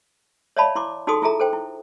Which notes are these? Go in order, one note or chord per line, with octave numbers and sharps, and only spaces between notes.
C#5 D5 E5 F5 A5 B5
E4 C6 D6
D#4 F#4 G#4 A4 C6 D#6
E4 F4 G#4 A4 E5 A#5
A4 C5 G5
E4